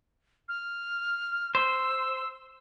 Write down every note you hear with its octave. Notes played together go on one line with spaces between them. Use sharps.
F6
C5 E6